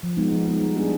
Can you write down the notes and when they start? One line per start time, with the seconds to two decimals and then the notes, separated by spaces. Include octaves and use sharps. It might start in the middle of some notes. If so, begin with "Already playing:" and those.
0.03 F3
0.17 G#3 B3 D#4
0.32 F3
0.47 G#3 B3 D#4
0.61 G3
0.76 B3 D4 G#4